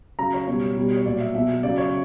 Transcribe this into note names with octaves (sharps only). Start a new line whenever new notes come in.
C#3 F#3 A#5
C#5
B2 G3 C#5
B2 G3
C#5
A#2 F#3 D5
E5
B2 F#3 E5
C#3 F#3 D5
C#5